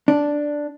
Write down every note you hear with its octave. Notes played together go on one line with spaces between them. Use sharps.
D4